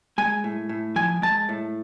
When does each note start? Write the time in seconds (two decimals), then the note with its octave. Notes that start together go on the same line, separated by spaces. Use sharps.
0.18 G#3 G#5
0.44 A2
0.69 A2
0.96 F3 G#5
1.22 G#3 A5
1.49 A2